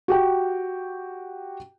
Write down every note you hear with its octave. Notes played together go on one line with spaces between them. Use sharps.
F#4 G4 G5